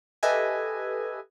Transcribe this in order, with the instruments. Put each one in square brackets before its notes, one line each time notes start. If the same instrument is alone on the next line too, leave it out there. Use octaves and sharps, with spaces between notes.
[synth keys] G4 A4 B4 D#5 E5 G#5